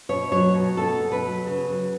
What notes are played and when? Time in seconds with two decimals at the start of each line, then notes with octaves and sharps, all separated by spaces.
0.09 B2 C#5
0.31 F#3 C#5
0.55 B2
0.77 B3 A4
1.00 B2
1.12 B4
1.23 F#3
1.46 C#3
1.69 F#3